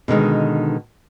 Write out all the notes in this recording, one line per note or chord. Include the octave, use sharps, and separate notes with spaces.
B2 D3 D#3 G#3